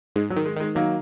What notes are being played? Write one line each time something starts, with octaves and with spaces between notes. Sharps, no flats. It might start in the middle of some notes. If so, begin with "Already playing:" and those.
G#2 G#3
F#3
D#3
G#3
D#3 G#3
D#3 F#3 A#3